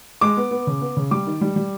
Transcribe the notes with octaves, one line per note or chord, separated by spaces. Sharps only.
G#3 D6
B3
B3
C#3
B3
C#3
G3 D6
D#3
G3
G3